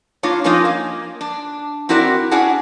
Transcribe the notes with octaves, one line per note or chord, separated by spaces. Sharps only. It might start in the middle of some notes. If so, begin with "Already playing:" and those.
A#3 D4 F4 C#5
F3 A#3 C#4 D#4 F4
A#3
D4
C4 E4 F#4 A#4 D5
C#4 D4 E4 G#4 F#5